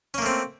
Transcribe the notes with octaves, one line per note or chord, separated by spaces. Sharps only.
A3 A#3 C4 C#4